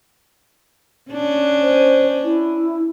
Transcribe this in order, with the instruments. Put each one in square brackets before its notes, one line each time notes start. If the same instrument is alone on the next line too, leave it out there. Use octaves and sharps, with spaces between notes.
[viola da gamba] C#4 D4
[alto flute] C5
E4